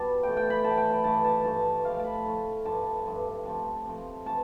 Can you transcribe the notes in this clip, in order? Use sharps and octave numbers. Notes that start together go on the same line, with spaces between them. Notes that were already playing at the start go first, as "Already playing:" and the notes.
Already playing: B2 G3 A5
A2 E3 A3 G5
G5
B5
A2 E3 A3 A5
G5
B5
G2 E3 A3 A5
A5
G2 E3 A3 A5
A2 F3 A3 F5
A5 B5
A2 F3 A3
G2 D3 F3 A5
G2 D3 F3
C3 F3 A3 A5
C3 F3 A3
E3 A3 A5